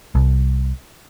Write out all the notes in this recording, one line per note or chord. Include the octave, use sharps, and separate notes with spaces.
C2